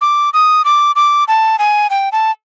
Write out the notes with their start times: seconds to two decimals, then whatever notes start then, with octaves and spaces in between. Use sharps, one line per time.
0.01 D6
0.33 D#6
0.65 D6
0.96 D6
1.28 A5
1.59 G#5
1.90 G5
2.12 A5